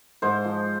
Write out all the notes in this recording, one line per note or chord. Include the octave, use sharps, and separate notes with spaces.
G#2 C5
F3